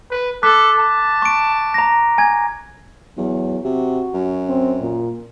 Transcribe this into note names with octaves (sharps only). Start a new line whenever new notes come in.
B4
A4 D6 F#6 B6
A5
C#6 D7
A#5 A#6
G#5 G#6
E2 F#3
C3 F#4
F#2
C4
A#2